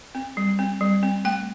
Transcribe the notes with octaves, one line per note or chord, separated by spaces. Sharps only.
C4
G3
C4
G3
C4
A3 G5